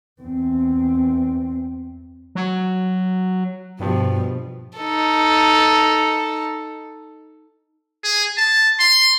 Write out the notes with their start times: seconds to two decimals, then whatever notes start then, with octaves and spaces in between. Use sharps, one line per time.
0.22 E2 C4
2.35 F#3
3.80 G2 B2 F3
4.78 D#4 A4
8.04 G#4
8.37 A5
8.79 C6